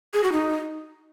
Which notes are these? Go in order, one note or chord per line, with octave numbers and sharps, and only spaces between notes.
G#4
F#4
D#4